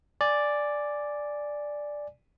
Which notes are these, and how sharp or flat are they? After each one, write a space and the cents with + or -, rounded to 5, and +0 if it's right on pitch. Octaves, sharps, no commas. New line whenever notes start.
D5 +0 G#5 +0